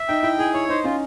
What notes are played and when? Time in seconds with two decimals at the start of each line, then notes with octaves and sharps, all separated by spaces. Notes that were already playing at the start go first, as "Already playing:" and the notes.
Already playing: E5
0.08 D#4 G5
0.23 E4 G5
0.39 E4 G#4
0.54 E4 C#5
0.69 D#4 C5
0.84 C#4 F4